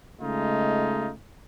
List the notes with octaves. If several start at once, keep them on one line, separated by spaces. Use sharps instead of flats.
C#3 G#3 A3 D#4 F4